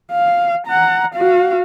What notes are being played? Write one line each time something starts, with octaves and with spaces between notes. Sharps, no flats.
F5
F#5 A#5
F#4 F5